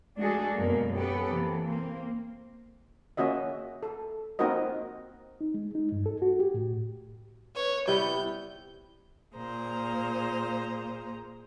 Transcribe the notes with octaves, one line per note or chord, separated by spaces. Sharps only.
G#3 A3 D4 F#4 G#4 A4
F#2 B2 A#3
B3 C#4 G4 A4 B4
C3 E3 A#3
A#3 C4
A#3 C#4 F#4 D#5 E5
A4
A#3 C4 D#4 F#4 A#4 D#5
D#4
G#3
D#4
G2
A4
F#4
G4
A2
B4 C#5
C3 G3 B3 E4 G6
A#2 A#3 G#4 C5 A#5